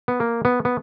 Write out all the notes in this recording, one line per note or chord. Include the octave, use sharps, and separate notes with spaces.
B3
A#3
B3
B3